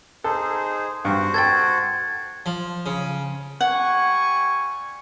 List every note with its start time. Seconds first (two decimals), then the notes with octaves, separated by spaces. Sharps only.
0.24 D#4 G#4 A4 C5
1.05 G2 F#4 C5 F#5
1.34 A4 G5 G#6 A6
2.46 F3
2.86 C#3
3.61 G3 F#5 G#5 C#6